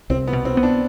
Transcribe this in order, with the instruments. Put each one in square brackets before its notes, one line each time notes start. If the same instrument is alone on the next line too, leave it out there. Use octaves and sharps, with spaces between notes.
[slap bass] C2 [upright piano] C4
[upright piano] B3
[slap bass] B2
[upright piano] C4
[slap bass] B3
[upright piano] D4